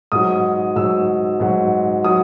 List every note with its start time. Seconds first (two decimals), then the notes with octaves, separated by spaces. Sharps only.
0.12 G#2 F#3 D#6
0.76 G#2 F#3 E6
1.40 G#2 F#3
2.04 F#3 D#6